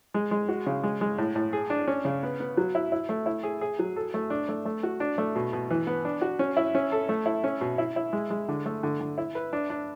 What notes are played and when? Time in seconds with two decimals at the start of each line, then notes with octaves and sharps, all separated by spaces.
0.14 G#3
0.31 G#3
0.48 F#4
0.66 C#3
0.83 G#3
1.01 G#3
1.18 A2
1.35 A2
1.53 G#4
1.70 D4
1.87 C#4
2.05 C#3
2.23 B3
2.40 B3
2.57 F#3
2.75 E4
2.92 E4
3.09 A3
3.26 E4
3.43 G#4
3.61 G#4
3.79 F#3
3.96 A4
4.14 A3
4.30 D4
4.49 A3
4.65 A3
4.83 F#4
5.00 D4
5.18 A3
5.36 B2
5.53 B2
5.70 E3
5.87 B3
6.05 D4
6.21 F#4
6.39 C#4
6.57 E4
6.75 C#4
6.92 A4
7.09 A3
7.26 E4
7.44 C#4
7.61 B2
7.78 E4
7.96 E4
8.13 G#3
8.30 G#3
8.48 D3
8.66 A3
8.83 D3
9.01 D3
9.18 E4
9.35 B4
9.53 D4
9.70 D4